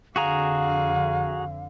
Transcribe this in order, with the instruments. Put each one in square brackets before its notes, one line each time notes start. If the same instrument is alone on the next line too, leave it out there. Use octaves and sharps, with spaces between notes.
[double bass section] F2 D3 [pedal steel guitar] F#4 G#4 A#5 [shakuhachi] F5